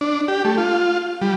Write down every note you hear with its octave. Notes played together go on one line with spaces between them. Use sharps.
D4
G4
A3
F4
G3